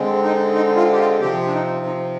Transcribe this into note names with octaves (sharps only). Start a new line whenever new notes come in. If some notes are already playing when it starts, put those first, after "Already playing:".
Already playing: D3 G#3 C4
D#4
D#4
F4
G4
F4
C3 F3 C4 G4
D4
D#4
D#4